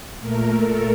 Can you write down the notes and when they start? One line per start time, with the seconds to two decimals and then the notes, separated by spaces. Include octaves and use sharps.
0.20 A#2 A3 A#4
0.53 A4